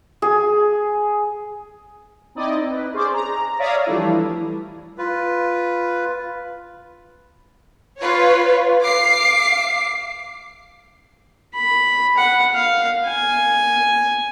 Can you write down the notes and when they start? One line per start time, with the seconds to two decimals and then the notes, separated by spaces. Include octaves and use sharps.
0.22 G#4
2.35 C4 D#4 E4 D5 D#5
2.70 B4
2.93 C#4 G#4 C5 D5
3.13 A#5
3.58 C#5 D5 E5 F5 A#5 D#6
3.86 E3 F3 G3 A3 D4 E4
4.98 F4 B4
7.99 F4 B4 C#5
8.82 F5 D6 C7
11.55 B5
12.17 F#5
12.54 F5
13.07 G#5